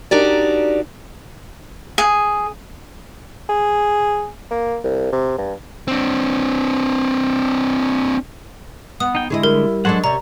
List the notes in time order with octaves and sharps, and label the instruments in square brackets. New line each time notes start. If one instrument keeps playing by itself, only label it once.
[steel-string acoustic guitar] D4 D#4 F#4 G4 A#4 D5
[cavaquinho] G#4
[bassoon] G#4
A#3
C2
C3
G2
[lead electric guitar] C4 D4
[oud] B3 [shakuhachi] F#5 [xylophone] D#6
[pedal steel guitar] D#4 G5
[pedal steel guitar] D3 G#3 [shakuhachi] E4 [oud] G#4 C5 D#5
[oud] G3 [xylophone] A#4
[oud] F#3 G#3 D4 [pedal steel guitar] A4 C5 F#5
[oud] C3 C#4 G4 [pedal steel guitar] C#5 [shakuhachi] D5 [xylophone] A#5